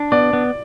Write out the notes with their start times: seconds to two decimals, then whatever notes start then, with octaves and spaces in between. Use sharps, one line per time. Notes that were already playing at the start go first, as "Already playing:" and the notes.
Already playing: D4
0.12 B3 D5
0.33 B3